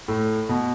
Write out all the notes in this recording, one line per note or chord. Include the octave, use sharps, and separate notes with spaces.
A2
B2